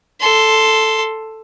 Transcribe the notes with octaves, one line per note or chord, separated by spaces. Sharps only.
A4 C6